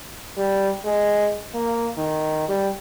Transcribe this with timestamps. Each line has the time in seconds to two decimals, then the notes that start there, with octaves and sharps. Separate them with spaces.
0.37 G3
0.85 G#3
1.55 A#3
1.98 D#3
2.49 G3